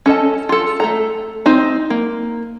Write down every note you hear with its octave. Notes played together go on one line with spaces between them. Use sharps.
C#4 A4 D#5 A5
F4 A4
A3 A4 A#5
C4 D#4
A#3